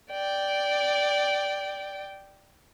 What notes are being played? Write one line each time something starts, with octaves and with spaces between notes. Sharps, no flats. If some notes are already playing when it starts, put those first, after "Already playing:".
D5 G5